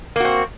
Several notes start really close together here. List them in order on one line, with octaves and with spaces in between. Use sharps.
A#3 F#4 C4